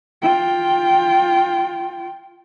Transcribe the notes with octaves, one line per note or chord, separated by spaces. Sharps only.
F4 G5